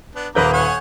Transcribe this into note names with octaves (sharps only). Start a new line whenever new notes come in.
B3 D4
D#1 A#3 B4 A#5 D6 G6
C#5 F#5 G#5